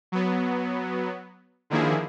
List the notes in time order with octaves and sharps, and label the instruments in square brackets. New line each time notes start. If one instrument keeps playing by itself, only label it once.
[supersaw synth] F#3 B3
D3 D#3 F3 A#3 E4 G#4